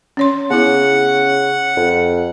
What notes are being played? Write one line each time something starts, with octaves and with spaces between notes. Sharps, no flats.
C#4 C#5 C6
C#3 B3 E4 F#5
F2